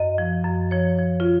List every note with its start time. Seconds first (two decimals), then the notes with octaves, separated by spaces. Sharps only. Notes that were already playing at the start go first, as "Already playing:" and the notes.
Already playing: F#2 D#5
0.18 F3
0.44 F#2
0.71 F3 C#5
0.99 F3
1.20 F4